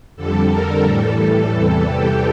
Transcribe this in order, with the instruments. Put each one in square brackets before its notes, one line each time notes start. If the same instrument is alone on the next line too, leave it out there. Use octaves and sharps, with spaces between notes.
[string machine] F2 D3 G3 A4
A#4
A2 E3 G3 A4
E2 C3 E3 G3
G4